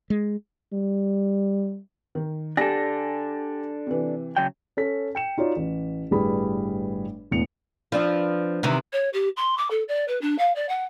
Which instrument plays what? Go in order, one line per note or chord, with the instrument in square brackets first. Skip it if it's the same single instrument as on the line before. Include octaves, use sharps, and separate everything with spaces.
[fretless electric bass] G#3
[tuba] G3
[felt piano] D#3
[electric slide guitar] D4 A4 [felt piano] G4 G#5 A#6
[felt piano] C3 E3
[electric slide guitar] C#3 F#3 G5
[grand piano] C#4 A4 B6
G5 C#7 E7
D#4 F4 F#4 C#5 D5
A1
G1 A2 G3 G#4 B4 B5
E1 A2 B3 C#7 F7
[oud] F3 [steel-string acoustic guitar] C4 D4 B4
[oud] C3 D#3 E3
[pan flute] C#5
G4
C6
D6
A4
D5
B4
D4
F5
D5
F#5